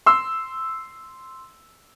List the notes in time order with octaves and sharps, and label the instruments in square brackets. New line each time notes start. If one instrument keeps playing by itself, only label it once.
[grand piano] C6 E6